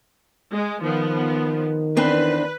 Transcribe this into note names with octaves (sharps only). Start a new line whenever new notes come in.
G#3
D#3 F3 B3
E2 C4 D4 B4